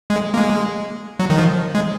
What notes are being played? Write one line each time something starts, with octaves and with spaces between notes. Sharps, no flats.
G#3
A#3
G#3
F#3
D#3
F3
G#3